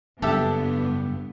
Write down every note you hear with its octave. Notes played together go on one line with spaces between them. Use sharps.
F#1 G2 B3 D4 G4 A4 E5